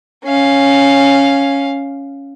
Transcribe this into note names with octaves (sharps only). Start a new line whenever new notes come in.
C#4 F5